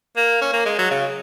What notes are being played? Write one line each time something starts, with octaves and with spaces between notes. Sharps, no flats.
A#3
C#4
A#3
G#3
F#3
C#3